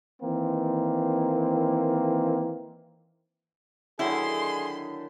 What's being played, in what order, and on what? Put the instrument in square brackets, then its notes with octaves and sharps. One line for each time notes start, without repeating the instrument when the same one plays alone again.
[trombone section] D#3 E3 A#3 C4
[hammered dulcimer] D3 D#3 F#3 [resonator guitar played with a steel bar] E4 [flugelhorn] G#4 [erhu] C6